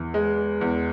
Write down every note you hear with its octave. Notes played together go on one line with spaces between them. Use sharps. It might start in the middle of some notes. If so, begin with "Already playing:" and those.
Already playing: E2 E3
G#3
E2